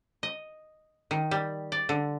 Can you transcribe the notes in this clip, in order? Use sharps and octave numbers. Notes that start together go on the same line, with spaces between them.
D#5
D#3
G3
D5
D3